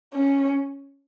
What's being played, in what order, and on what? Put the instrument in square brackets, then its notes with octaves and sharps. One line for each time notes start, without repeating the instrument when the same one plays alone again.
[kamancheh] C#4